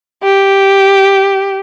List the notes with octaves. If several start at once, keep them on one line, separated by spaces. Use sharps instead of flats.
G4